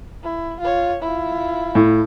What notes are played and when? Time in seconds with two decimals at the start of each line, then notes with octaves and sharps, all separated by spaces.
0.23 E4
0.60 F4 C#5
1.02 E4 F4
1.75 A2